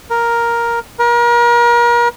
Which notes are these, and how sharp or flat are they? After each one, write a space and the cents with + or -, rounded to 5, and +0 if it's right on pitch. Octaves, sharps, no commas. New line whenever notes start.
A#4 +5
A#4 +35